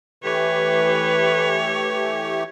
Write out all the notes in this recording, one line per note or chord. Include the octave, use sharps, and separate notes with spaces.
E3 A3 G4 B4 C#5